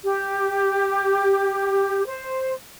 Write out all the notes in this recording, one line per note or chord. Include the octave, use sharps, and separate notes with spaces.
G4
C5